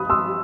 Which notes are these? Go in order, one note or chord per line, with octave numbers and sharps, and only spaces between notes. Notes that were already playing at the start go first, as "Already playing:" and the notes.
Already playing: B5 D#6 F#6
C6 E6